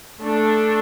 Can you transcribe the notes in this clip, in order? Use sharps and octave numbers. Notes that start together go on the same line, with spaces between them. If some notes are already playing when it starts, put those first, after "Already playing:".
A3 D4 A4